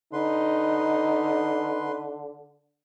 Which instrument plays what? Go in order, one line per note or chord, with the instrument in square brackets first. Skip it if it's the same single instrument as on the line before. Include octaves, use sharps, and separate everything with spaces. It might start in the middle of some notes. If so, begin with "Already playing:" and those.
[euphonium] D3 [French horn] D#4 [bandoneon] B4 C6